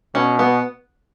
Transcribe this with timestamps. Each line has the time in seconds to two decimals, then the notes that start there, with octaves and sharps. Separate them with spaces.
0.15 B2 C#4
0.39 B3